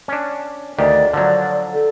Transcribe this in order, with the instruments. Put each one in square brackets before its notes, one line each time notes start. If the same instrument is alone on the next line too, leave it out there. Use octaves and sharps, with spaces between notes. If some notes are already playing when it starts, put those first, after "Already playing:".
[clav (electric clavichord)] C#4 D4
[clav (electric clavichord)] D2 D#3 G4 [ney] D5
[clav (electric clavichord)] D3 F3 F#3 [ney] D5
[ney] A4